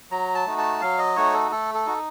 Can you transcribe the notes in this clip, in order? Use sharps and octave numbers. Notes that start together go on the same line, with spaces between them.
F#3 A#5
A5
A3 D#4 F#4
A5
F#3 F5
D#5
A3 D#4 F#4 C#5
A4
A3 A4
A4
D#4 F#4